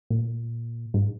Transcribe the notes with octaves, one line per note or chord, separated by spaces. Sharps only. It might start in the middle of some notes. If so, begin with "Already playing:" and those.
A#2
G#2